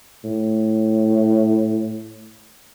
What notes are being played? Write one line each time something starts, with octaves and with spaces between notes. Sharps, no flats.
A2